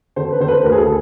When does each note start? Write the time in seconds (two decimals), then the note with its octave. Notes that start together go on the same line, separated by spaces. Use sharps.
0.16 D3 C5
0.32 B4
0.40 D3 C5
0.48 B4
0.63 D2 A#4
0.72 G#4
0.79 A4